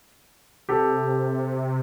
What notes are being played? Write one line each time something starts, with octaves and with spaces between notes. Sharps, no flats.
C3 G4 A4